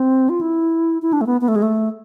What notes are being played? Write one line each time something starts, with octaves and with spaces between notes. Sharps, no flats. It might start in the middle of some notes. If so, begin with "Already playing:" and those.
Already playing: C4
F4
E4
E4
D4
A3
B3
B3
A3
G#3
A3